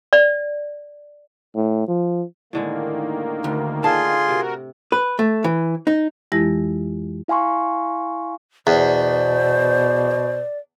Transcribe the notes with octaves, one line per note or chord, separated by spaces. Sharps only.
D5
A2
F3
A2 D3 D#3 G#3 A#3
D2
D3 F4 G#4 A5 C6
C3 F#4 A#4
B4
A3
E3
D#4
F2 E3 G#3 E4 G4 A#6
E4 F5 G#5 C6 C#6
E2 B2 C5 D5